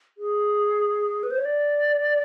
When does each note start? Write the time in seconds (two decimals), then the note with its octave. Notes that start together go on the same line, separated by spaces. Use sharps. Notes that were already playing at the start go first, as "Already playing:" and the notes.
0.18 G#4
1.23 B4
1.31 C5
1.38 C#5
1.45 D5